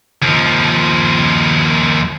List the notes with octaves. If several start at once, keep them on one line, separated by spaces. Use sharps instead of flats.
D#2 F3